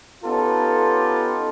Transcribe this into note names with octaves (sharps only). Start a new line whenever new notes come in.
B3 C#4 D#4 F4 G4 A4